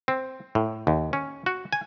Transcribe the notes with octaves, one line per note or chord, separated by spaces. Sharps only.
C4
A2
D#2
C#4
F#4
G#5